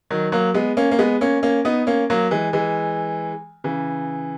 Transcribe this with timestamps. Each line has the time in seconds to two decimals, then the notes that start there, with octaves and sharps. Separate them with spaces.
0.10 D#3 F#3
0.32 F#3 A#3
0.54 G#3 B3
0.77 A#3 C#4
0.91 A#3
0.99 G#3 B3
1.21 A#3 C#4
1.43 A#3 C#4
1.65 B3 D#4
1.87 A#3 C#4
2.10 F#3 A#3
2.31 E3 G#3
2.53 E3 G#3
3.64 C#3 E3